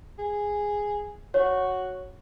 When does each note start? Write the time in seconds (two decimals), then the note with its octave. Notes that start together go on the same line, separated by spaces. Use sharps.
0.18 G#4
1.34 F#4 C#5